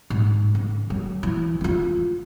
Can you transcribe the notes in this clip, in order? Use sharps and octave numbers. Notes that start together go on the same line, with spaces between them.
G#2
C#3
F#3
E3
D4 F4